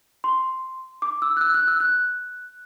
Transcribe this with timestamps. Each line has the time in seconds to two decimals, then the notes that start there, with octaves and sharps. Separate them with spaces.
0.24 C6
1.02 D6
1.22 E6
1.37 F#6
1.41 E6
1.54 F#6
1.68 E6
1.80 F#6